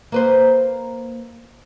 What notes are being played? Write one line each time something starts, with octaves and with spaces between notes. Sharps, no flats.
A#3 B4 C5